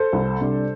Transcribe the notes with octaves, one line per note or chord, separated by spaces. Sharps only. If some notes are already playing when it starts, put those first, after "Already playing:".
Already playing: A4 C5
C2
C3 G3 D4